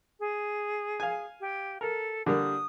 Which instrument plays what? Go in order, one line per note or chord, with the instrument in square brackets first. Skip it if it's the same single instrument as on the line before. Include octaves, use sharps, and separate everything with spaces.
[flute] G#4
[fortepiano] F5 G#5
[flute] G4
[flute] A4 [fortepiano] A#4
[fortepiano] D3 G3 A#3 [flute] D#6